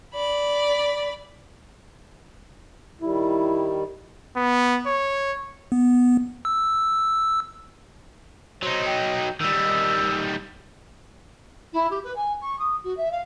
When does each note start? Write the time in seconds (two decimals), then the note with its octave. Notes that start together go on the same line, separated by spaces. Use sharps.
0.14 D5 B5
3.02 D#3 G3 E4
4.37 B3
4.87 C#5
5.72 B3
6.45 E6
8.62 F#3 D#4 C5
8.86 G5
9.41 D#3 G3 E6
11.73 E4
11.90 G4
12.04 B4
12.15 G#5
12.41 C#6
12.59 D#6
12.84 F#4
12.97 E5
13.11 F5